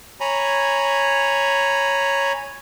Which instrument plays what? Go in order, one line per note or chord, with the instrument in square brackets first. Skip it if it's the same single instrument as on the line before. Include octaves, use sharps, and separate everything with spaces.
[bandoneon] C#5 G#5 A#5 B5